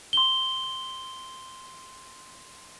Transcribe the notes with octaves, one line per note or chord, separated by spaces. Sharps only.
C6 G7